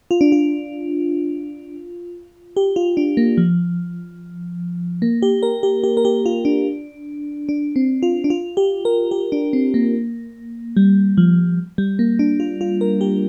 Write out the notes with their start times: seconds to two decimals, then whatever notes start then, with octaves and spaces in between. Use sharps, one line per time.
0.11 F4
0.21 D4
0.32 F4
2.57 G4
2.76 F4
2.97 D4
3.17 A#3
3.37 F3
5.02 A#3
5.22 G4
5.43 A#4
5.63 G4
5.84 G4
5.97 A#4
6.05 G4
6.26 F4
6.45 D4
7.49 D4
7.76 C4
8.03 F4
8.24 D4
8.30 F4
8.57 G4
8.85 A#4
9.11 G4
9.32 D4
9.53 C4
9.74 A#3
10.77 G3
11.18 F3
11.78 G3
11.99 A#3
12.19 D4
12.40 F4
12.61 F4
12.81 A#4
13.01 G4